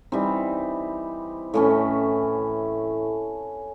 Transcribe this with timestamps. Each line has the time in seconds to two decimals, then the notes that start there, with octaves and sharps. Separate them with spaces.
0.12 E3 G3 C4 D#4
1.54 A2 E3 A3 C#4